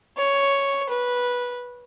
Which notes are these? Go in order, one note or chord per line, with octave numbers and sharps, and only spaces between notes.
C#5
B4